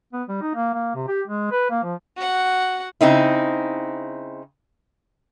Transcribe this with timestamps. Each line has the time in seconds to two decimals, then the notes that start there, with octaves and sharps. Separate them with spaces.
0.13 B3
0.28 G3
0.42 D#4
0.55 A#3
0.73 A#3
0.95 C3
1.08 G4
1.28 G#3
1.51 B4
1.70 A#3
1.83 F3
2.17 F#4 F#5
3.01 C#3 C4 D#4 E4